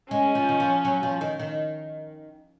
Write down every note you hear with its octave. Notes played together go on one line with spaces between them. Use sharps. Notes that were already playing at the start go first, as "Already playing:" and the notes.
G#3 C#4
F3
D#3
F3
F#3
F3
D#3
D#3